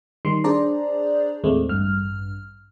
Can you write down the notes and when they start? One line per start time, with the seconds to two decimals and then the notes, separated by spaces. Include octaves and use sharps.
0.25 D#3 G3 C6
0.44 D4 G#4 C5 D5 A#5
1.44 D#2 A2 G#3 A3 C4
1.69 A1 G2 F6